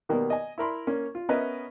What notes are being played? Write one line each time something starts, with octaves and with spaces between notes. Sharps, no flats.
B2 D#3 G3 A#3 B3
D#5 G#5
E4 A#4 B5 C6
A#3 C#4
F4
B3 C#4 A#4 B4 D#5 E5